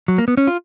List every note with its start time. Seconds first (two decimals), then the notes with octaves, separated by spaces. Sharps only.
0.08 F#3
0.18 A#3
0.28 B3
0.37 C#4
0.47 F4